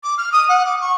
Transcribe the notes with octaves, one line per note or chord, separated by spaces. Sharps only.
D6
F6
D#6
F#5
D6
C#6